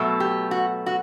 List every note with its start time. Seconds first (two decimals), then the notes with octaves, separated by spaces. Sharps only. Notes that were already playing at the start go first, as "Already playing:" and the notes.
Already playing: B2 F#3 A3
0.20 G4
0.51 F#4
0.86 F#4